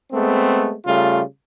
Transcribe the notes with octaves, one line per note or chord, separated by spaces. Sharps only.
G#3 A3 B3 C4
C#3 G3 A3 F4